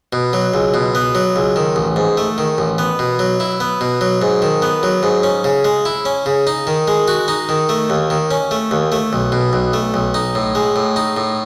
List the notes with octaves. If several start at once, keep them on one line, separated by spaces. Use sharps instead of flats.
B2
F#3
C#2
B2
B3
F#3
C#2
D#3
A1
G#2
A3
D#3
A1
B3
B2
F#3
E4
B3
B2
F#3
G#2
D#3
B3
F#3
G#2
C#4
C#3
G#3
E4
C#4
C#3
D#4
D#3
G#3
F#4
D#4
D#3
A3
D#2
D#3
C#4
A3
D#2
A3
B1
B2
B1
A3
B1
D#4
A2
G#3
A2
D#4
A2